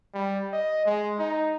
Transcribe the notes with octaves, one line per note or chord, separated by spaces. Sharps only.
G3
D#5
G#3
D#4